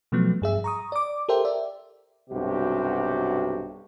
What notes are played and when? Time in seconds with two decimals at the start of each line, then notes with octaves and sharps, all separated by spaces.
0.12 B2 F3 F#3 A3 B3
0.42 G2 G#4 E5
0.64 A#5 C#6 D#6
0.92 D5 D6
1.29 G4 A4 A#4 C5 E5 G5
1.45 D5 E5
2.30 B1 G2 C3 F#4 G4